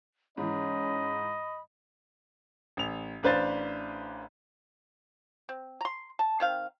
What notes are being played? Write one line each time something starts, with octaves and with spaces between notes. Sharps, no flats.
G#2 E3 C#4 D#5 B5
A1 F7
A1 D4 B4 C5 F5 A6
C4
A#5 C6
A5
D#3 C4 F5